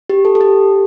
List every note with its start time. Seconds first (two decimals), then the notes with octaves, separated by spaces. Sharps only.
0.09 G4
0.25 A4
0.35 A4
0.41 G4